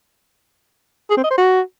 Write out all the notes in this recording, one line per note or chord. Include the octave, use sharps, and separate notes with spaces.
G#4
C4
D#5
C5
F#4